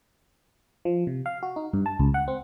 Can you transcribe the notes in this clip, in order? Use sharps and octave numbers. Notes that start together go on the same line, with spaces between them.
F3
C3
F5
F#4
D#4
G2
A5
C#2
F#5
C4